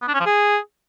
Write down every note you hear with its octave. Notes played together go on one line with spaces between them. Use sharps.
B3
D4
C#4
F3
G#4